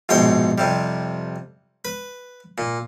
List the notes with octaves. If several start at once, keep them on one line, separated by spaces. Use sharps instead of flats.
A#1 G#2 B2 C#5 G5 C6
F2 C3 G3
B4
A#2